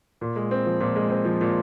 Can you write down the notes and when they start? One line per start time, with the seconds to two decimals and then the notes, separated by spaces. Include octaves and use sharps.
0.21 A#2
0.36 G#3
0.51 C4
0.66 F3
0.80 A#2
0.96 G#3
1.10 C4
1.25 F3
1.41 A#2